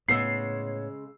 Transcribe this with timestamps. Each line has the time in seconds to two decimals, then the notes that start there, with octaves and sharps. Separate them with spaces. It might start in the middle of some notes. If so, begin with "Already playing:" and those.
0.09 A2 C#3 G#3 B3 C#5 E6 C7